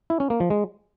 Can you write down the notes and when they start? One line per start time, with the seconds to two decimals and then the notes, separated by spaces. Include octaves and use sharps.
0.10 E4
0.20 C#4
0.30 A#3
0.40 F3
0.50 G#3